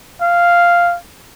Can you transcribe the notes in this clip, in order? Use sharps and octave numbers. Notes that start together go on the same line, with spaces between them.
F5